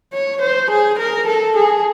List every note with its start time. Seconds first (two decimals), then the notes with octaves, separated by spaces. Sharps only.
0.13 C#5
0.42 C5
0.71 G#4
0.99 A#4
1.27 A4
1.57 G#4